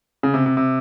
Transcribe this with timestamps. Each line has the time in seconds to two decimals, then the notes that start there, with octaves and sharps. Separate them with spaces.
0.23 C#3
0.34 C3
0.46 C3
0.57 C3